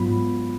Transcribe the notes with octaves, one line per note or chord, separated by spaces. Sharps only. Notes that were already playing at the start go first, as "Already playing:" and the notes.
Already playing: G#2 F#3 B3 F4 B5